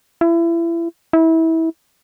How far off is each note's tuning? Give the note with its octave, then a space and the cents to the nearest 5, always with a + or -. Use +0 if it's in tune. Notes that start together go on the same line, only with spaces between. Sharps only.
E4 +30
E4 -25